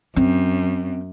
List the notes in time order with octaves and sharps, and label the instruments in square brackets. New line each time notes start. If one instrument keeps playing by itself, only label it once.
[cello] F#2 [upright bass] C4